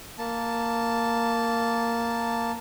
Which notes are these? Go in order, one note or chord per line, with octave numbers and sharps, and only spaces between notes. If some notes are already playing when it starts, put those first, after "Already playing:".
A#3 A5